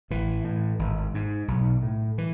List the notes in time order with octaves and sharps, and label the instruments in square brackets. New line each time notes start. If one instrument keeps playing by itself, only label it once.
[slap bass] A1 E3
A2
G#1
G#2
B1
A2
E3